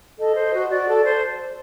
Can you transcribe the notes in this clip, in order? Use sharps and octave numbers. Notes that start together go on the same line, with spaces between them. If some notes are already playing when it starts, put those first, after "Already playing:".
A4 D#5
C5
F#4
F#4 D5
A4
C5